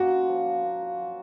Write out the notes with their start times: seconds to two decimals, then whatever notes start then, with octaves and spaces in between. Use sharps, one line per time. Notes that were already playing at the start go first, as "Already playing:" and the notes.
Already playing: A#3 C#4 F#4
0.10 F4
0.28 F3
0.46 F3
0.63 A#3
0.81 F4
0.99 F#3